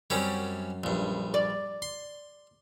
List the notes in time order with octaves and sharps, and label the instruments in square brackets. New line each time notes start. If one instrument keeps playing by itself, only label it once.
[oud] F#2 [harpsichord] G3 C4 C#4
[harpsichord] A#1 G2
[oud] D5
[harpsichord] C6